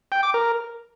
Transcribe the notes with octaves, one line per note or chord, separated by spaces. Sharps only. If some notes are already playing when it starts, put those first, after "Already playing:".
G5
D6
A#4